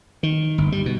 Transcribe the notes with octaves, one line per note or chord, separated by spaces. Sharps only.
D#3
G1
G3
B2